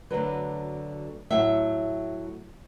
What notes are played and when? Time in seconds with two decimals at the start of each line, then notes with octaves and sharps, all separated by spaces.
0.11 D2 D3 F#3 B4
1.30 A2 F#3 E5